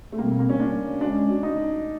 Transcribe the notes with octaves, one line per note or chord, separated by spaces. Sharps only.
A3
B2 G3 A#3 C4
A#3
C#4
D4
G#3 C#4 D4 F#4
D#4